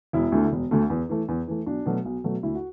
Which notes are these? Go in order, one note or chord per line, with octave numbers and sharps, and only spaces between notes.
E1 E4
D2 D3 A3
E1
D2 D3 A3
E2
E3 A3
E2
E3 A3
B1 D4
B2 F#3 A3
B1
B2 F#3 A3
D2 E4
F#4